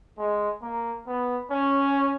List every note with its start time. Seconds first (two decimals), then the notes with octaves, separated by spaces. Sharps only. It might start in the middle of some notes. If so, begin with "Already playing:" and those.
0.18 G#3
0.62 A#3
1.07 B3
1.51 C#4